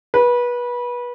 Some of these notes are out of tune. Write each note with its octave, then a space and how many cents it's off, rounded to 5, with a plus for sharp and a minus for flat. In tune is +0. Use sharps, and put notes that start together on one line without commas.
B4 -25